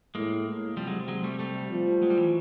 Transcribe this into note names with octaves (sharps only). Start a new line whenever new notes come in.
A2 G#3 A#3
C3 F3 G3
F#3 G#3
F#3 G#3
G3 A3
G3 A3
F3
F#3 G#3
G3
E3 F#3